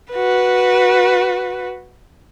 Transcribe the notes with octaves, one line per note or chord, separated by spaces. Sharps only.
F#4 B4